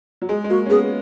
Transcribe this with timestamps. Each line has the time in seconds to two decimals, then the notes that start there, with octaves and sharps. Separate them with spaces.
0.22 F#3
0.28 G#3 G#4
0.44 G#3
0.50 A#3 F#4
0.66 C#4
0.70 B3 G#4